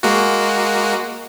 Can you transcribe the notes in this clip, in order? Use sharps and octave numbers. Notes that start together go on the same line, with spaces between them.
G#3 A#3 F#4